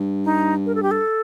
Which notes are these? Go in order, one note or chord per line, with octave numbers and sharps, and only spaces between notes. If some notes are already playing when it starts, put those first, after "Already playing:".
Already playing: G2
D#4
A#4
A4
G4
A4